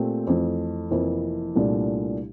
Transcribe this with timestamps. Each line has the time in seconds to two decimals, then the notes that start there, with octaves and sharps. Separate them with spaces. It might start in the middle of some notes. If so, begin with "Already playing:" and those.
Already playing: A#2 A3 C4 G4
0.27 F2 E3 A3
0.91 F1 F2 E3 A#3 E4
1.56 C2 A#2 A3 D4